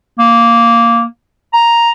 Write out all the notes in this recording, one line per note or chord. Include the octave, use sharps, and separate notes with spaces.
A#3
A#5